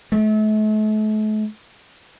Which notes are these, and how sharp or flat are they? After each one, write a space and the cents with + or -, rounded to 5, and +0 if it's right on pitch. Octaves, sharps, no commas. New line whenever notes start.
A3 -40